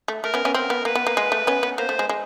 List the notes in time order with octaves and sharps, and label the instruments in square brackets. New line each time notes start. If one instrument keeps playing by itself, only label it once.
[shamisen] A3
[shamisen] A3 [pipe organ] A#4
[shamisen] B3 C#4
B3 C#4
[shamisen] C4 [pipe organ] A#4
[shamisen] B3
[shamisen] A#3 [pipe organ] B4
[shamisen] B3
A#3
G#3
A3
B3 C#4
B3
[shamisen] A#3 [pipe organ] C5
[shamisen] A3
G#3
G#3